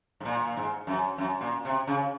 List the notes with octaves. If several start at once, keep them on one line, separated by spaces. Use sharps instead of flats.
G#2
A#2
A#2
G#2
F#2
F#2
A#2
C3
C#3